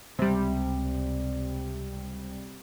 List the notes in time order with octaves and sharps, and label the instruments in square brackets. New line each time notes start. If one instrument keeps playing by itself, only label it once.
[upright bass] C#2 [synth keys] C3 G3